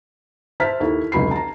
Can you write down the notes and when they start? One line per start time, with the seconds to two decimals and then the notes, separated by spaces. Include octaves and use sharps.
0.60 C5 E5 A5 F6 B6
0.80 D#2 E4 A4
1.12 F1 C#2 F#3 B5 C7
1.31 A5 A#5